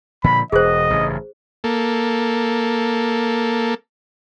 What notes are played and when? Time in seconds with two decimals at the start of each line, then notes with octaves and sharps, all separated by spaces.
0.24 A#2 D3 F3 B5
0.52 E1 G#4 C5 D#5
0.90 A1 G2 C#3
1.64 A#3 A4